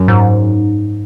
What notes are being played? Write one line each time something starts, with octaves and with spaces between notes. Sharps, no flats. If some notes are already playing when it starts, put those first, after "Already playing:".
Already playing: F#2
G#2